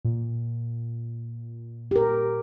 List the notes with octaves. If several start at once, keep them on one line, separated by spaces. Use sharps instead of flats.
A#2
G4 A#4